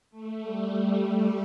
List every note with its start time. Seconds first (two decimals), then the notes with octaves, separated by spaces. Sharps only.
0.11 A3
0.42 G3